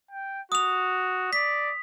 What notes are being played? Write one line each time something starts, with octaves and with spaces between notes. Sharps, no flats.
G5
F#4 D#6 F7
D5 B6